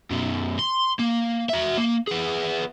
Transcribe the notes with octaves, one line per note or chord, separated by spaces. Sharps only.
F#2 B2
C6
A#3
F#4 E5
A#3
B3 G#4